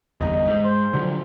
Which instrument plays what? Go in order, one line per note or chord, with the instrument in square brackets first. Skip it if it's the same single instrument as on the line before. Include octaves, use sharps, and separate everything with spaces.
[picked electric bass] G1 E2 [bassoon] D#4
[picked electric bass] G#2
[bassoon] C5
[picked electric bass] D3 F3 F#3